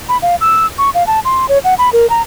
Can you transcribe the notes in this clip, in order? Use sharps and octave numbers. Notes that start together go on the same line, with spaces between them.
B5
F5
E6
C#6
F5
A5
C6
C#5
F#5
B5
A#4
A#5